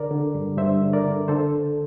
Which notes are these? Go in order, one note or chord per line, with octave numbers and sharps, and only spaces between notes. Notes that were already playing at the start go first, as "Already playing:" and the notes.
Already playing: D3 A#4 D5
D3
G2
G2 C5 E5
D3
A#4 D5
D3
D3 A4 C5